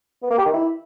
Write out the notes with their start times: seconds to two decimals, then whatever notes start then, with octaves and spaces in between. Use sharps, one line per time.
0.23 B3
0.30 A#3
0.38 G4
0.45 D#3
0.53 E4